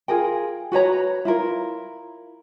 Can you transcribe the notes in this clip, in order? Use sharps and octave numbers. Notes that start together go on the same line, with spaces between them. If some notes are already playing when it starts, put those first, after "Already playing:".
F4 G#4 A#4 G5
F#4 B4 C#5 A#5
E4 F4 A#4